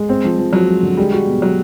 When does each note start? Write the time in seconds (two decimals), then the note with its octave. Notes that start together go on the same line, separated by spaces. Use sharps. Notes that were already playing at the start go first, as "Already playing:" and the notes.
Already playing: G#3
0.09 C4
0.24 F3
0.39 F3
0.53 F3 F#3
0.68 G#3
0.83 D3
0.97 G3 G#3
1.13 F#4
1.27 B2
1.42 F#3 F#4